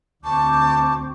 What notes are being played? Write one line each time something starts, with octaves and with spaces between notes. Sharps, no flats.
D2 C4 A5 C#6 D6 G6